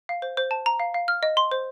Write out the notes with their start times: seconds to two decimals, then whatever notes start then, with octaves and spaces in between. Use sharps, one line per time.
0.09 F5
0.22 C5
0.37 C5
0.51 A5
0.66 A#5
0.80 F5
0.94 F5
1.08 F6
1.23 D#5
1.37 C6
1.51 C5